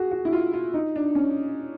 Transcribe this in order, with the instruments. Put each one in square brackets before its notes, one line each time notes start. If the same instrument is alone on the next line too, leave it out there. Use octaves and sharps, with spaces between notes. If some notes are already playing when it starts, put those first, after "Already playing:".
Already playing: [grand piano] F#4 G#4
F#4
E4
F4
F4
D#4
D4
C#4